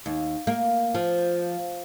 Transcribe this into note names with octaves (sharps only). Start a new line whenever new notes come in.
D#2
A#3
F3